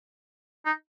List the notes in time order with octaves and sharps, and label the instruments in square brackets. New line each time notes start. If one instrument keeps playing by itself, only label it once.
[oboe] D#4